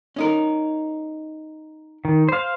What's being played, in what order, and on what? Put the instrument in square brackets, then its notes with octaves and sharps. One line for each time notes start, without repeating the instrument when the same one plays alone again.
[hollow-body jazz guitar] C#4 D#4 A#4
[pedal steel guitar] D#3
C5 F5